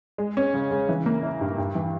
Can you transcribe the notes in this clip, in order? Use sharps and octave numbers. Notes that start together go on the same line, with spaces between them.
G#3
C#4
C#3
C#3
E3
A#3
E4
G2
G2
E3